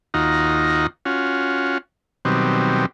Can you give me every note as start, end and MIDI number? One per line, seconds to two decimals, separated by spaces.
0.14 0.87 39
0.14 0.87 63
0.14 0.87 65
0.14 0.87 66
0.14 0.87 82
1.06 1.78 61
1.06 1.78 65
1.06 1.78 66
2.25 2.86 47
2.25 2.86 51
2.25 2.86 54
2.25 2.86 55
2.25 2.86 60